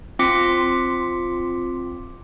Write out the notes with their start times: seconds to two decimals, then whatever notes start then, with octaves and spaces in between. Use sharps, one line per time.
0.19 C4 F4 C6 D6 B6 C#7